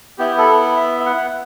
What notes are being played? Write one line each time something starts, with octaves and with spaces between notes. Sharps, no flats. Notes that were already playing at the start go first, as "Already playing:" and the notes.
B3 E4 G4
A4
E5
E5
F#5